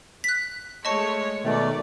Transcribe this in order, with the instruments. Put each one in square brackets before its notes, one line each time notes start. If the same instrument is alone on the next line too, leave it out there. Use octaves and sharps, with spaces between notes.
[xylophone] F#6 B6
[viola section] G#3 A3 C#5 [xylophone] D#5 A5 C#6
[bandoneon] B2 D#3 A3 [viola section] D5